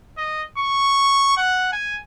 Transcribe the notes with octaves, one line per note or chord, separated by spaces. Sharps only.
D#5
C#6
F#5
G#5